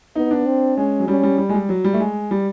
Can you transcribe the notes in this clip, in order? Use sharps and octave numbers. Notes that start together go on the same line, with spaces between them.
B3 D#4
D4
C4
G#3 C#4
F#3
G3 C#4
G3
G3
G#3
G3
F#3
G3
A3
G#3
G3